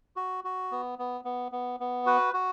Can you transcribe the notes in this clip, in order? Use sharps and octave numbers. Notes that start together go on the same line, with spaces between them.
F#4
F#4
B3
B3
B3
B3
B3
F#4 B4
F#4